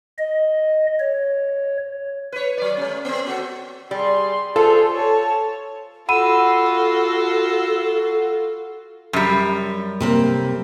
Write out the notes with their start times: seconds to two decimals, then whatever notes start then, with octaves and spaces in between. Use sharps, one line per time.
0.18 D#5
1.00 C#5
2.32 B4 C#5
2.58 F#3 D5
2.77 G#3 C4 C#4
3.05 B3 C4
3.25 B3 F#4 A4
3.91 G3 G#4 C6
4.56 F4 G#4 A4 C5
4.92 C#5 A5
6.09 F4 F#4 A4 F#5 B5 E6 D#7
9.13 F#2 G3
10.01 C3 A#3 C4